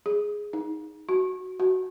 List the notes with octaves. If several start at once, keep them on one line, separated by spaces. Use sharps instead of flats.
G#4
D#4
F#4
F#4